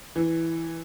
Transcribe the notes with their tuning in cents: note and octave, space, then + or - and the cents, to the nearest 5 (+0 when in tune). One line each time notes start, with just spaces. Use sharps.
E3 +0